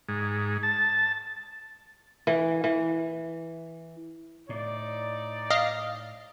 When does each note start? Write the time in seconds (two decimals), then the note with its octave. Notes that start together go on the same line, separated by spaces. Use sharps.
0.08 G#2
0.63 A5
2.27 E3
2.64 E3
4.49 A2 D#4 D5
5.50 D#5 F5